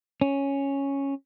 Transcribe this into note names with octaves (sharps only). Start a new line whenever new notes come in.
C#4